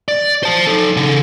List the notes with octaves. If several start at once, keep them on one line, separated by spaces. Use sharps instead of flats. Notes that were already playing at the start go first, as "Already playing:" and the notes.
D5
C5 A5
D#4 A4
C#3 A4